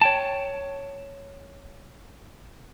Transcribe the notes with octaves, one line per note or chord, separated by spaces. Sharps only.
C#5 G5 A5